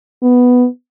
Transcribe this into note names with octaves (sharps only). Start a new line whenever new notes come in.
B3